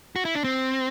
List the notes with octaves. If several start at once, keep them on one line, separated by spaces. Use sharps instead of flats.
F#4
E4
D4
C4